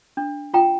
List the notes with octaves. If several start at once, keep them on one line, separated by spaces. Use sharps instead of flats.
D4
F4 G5 A#5